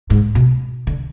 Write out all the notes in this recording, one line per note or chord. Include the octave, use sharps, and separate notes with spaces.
G#2
B2
D3